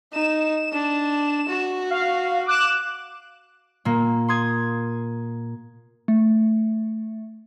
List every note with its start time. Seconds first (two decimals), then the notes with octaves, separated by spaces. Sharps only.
0.13 D#4 E7
0.73 D4
1.49 F#4
1.90 F5
2.46 D6 F#6 E7
3.85 A#2 A#3
4.28 C6 D#6 G#6
6.08 A3